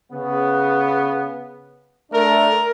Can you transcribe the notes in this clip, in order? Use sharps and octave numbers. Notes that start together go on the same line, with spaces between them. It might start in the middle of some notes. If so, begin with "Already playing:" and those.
C#3 B3
A3 D4 A#4